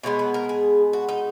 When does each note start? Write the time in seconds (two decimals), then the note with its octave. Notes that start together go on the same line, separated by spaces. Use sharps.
0.03 B2 G#3 B3 C#5
0.19 B4
0.34 A#4
0.49 G#4
0.93 F#4
1.09 D#4